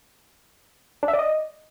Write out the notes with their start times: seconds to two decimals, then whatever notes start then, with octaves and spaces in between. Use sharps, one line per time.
1.03 D4
1.08 E5
1.13 D5
1.19 D#5